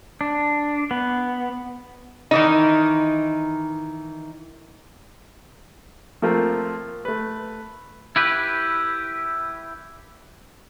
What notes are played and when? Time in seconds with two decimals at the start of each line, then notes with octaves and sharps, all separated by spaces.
0.21 D4
0.91 B3
2.31 D#3 E3 D#4
6.22 F3 A3 A#3 C4 F4 A#4
7.05 A3 B4
8.16 E4 G4 B4